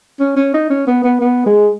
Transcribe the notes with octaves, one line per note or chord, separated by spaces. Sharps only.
C#4
C#4
D#4
C#4
B3
B3
B3
G#3